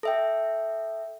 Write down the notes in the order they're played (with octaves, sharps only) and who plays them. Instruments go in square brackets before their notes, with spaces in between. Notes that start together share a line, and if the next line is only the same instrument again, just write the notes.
[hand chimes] A4 E5 G5